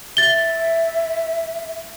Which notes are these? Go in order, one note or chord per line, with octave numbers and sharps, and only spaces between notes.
E5 A6 G7